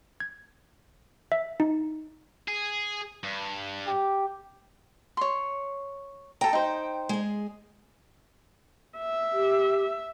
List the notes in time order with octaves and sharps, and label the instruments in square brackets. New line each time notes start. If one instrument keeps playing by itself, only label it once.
[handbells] G#6
E5
D#4
[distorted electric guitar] G#4
G2
[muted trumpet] G4
[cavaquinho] C#5 C6
[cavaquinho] A4 A#5 [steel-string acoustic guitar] G5
[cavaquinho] D#4 C5
[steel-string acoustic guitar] G#3 G#4
[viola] E5
[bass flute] G4